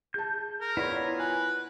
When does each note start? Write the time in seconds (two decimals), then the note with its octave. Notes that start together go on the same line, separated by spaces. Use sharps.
0.14 G#4 A5 G6
0.61 A#4
0.77 B3 E4 F4 C#5 D5
1.19 B4 G#5